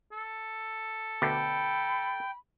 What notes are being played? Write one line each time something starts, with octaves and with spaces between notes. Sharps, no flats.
A4
D2 B2 D3 G5 B5